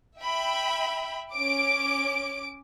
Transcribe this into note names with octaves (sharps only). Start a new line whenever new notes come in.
E5 G5 B5
C#4 D6 D7